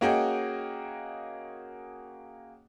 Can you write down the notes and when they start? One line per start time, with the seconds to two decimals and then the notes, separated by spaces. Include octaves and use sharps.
0.01 A#3 C#4 F#4 G#4 D#5 G5